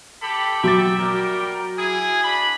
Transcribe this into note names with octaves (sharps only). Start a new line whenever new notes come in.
G4 A4 B5
F#3 E5 G5 D6 A6
G3 A#4 G5
E4 G#4
D4 B5